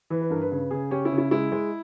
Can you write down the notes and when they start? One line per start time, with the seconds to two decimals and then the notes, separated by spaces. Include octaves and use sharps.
0.10 E3 B4
0.21 B4
0.30 G2 A#4
0.42 B4
0.52 C#3 B4
0.71 C#3 G#4
0.91 C#4 G4
1.05 E4
1.12 C#3
1.18 E4
1.31 G#3 E4
1.52 G#3